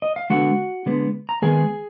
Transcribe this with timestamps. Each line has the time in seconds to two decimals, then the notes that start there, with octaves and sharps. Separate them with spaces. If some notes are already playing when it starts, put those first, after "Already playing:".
0.02 D#5
0.16 F5
0.30 D3 G#3 B3 F#4 F#5
0.86 D3 G#3 B3
1.29 A#5
1.42 D#3 G#3 B3 G#4 G#5